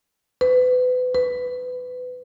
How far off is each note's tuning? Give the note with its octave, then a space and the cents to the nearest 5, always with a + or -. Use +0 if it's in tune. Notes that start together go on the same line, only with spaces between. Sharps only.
B4 +30
B4 +20